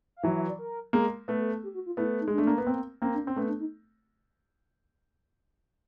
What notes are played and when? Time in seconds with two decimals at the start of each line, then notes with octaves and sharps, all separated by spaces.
0.16 F5
0.23 E3 F#3 E5
0.35 E5
0.48 D5
0.59 A#4
0.93 G#3 A#3
1.28 A3 B3 A4
1.63 G4
1.74 F#4
1.86 F4
1.97 A3 B3 E4
2.20 D#4
2.28 G#3
2.32 D4
2.38 A3
2.47 A#3
2.58 B3
2.67 A#3 C4
3.02 A#3 C4 C#4
3.14 D4
3.25 C4 C#4
3.36 A3 B3 C#4
3.48 D4
3.60 D#4